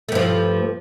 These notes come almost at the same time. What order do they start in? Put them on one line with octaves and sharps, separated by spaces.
A3 G2 F3